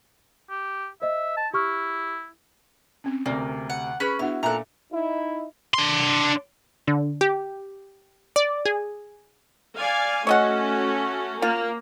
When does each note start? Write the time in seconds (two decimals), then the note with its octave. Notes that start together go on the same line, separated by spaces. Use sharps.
0.50 G4
1.02 C5 D#5 E5
1.37 A5
1.54 E4 G4 C#6 F6
3.04 C4 C#4
3.26 D2 C3 A#3 D5
3.70 F#5
4.00 C#4 G#4 B4 B5 F#6
4.19 B3 D4 E4 F#4 F#5 F6
4.43 A#2 A4 E5 A#5 F#6
4.92 D#4 E4
5.74 D4 C6
6.87 D3
7.21 G4
8.36 D5
8.65 G#4
9.78 D5 F5 G#5
10.27 A3 C#4 F#4 C#5 D#5 F#5
11.42 A#3 F4